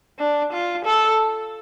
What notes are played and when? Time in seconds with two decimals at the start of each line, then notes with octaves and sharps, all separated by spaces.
0.19 D4
0.53 F4
0.85 A4